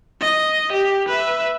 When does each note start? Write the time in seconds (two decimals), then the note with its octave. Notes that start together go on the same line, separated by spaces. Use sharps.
0.21 D#5
0.73 G4
1.09 B4 E5